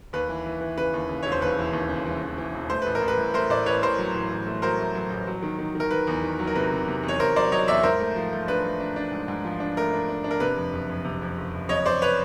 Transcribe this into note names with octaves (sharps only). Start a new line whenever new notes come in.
D#2 B4
E3
E3
E3
C#3 B4
D#2
C#3
E1 C#5
C5
D#2 B4
E3
D#2
C#3
E3
E3
E3
E1
A3 C5
A1 B4
A#4
A1
B4
A2
A3 A#4 C5
A2 C5 D5
A1 B4 C#5
A1 A#4 C5
F#3
A1
A1
A3
F#3 A#4 C5
A3
F#3
A1
F#3
D#3
D#3
D#3
A#4
D#3 B4
E2
D#3
F#3
A#4
C3 B4
C3
C3
E2
C#5
E2 A#4 C5
F#3 C5 D5
F#3 C#5 D#5
E2 D5 E5
G#2 A#4 C5
A3
F3
A3
D4 B4
A3
D4
D4
G#2
G#2
F3
D4
A3 A#4
D4
D4
D4
A#4
C3 B4
F2
F#1
F2
C3
F2
F#1
F#1
F2 C#5 D#5
F#1 C5 D5
B4 C#5